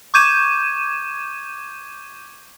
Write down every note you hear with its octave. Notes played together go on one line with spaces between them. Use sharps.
C#6 D6 G6 G#6 D#7 E7